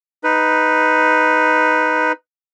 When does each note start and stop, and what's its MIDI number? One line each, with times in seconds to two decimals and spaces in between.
0.24 2.12 63
0.24 2.12 71